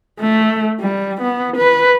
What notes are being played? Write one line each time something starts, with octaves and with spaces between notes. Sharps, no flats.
A3
G3
B3
B4